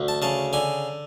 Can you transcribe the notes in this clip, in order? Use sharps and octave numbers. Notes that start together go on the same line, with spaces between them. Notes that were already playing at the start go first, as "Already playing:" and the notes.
Already playing: D2
A5
C#3 A5
D3 G#5